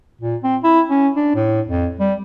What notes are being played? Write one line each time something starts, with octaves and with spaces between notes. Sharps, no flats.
A#2
C4
E4
C#4
D4
A2
F2
G3